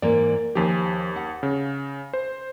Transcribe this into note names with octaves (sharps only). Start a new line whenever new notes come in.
G#2 E3 A#3 D5
D#2 F3 G4 G#5
F#5
C#3
C5